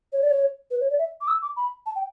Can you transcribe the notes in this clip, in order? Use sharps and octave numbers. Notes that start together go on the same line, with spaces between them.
C#5
D5
C#5
B4
C#5
D5
E5
D6
E6
D6
B5
A5
G5